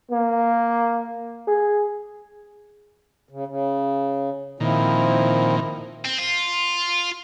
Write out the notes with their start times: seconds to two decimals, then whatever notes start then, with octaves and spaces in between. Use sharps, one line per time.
0.11 A#3
1.47 G#4
3.29 C#3
3.47 C#3
4.60 A#2 D#3 F3 C4 E4
6.05 C4
6.18 F4